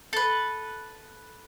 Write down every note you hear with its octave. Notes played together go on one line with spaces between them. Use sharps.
A4 B4